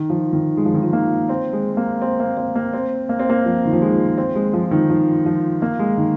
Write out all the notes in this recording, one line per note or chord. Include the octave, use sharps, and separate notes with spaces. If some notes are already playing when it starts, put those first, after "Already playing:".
Already playing: D#3
F3
D#3
G#3
F3
D#3
F3
A#3
C4
G#3
A#3
C4
A#3
C4
A#3
C4
A#3
C4
A#3
F3
D#3
F3
G#3
C4
G#3
F3
D#3
F3
F3
A#3
G#3
D#3